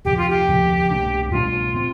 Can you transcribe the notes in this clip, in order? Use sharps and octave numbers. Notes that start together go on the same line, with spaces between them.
D2 C3 F3 G4
F4
G4
D2 C3 F3
C2 B2 A3 D4
C2 B2 A3 D4 F4
C3 F3 C4